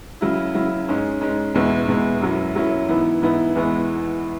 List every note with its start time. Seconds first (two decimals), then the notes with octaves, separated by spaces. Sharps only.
0.21 C#3 F#3 E4
0.54 C#3 F#3 E4
0.88 G#2 G#3 C#4
1.21 G#2 G#3 C#4
1.54 E2 B2 G#3 E4
1.88 E2 B2 G#3 E4
2.21 F#2 F#3 C#4 E4
2.55 F#2 F#3 C#4 E4
2.88 G#2 E3 B3 E4
3.22 G#2 E3 B3 E4
3.55 E2 E3 G#3 B3 E4